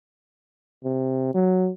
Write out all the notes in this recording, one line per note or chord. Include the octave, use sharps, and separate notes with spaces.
C3
F#3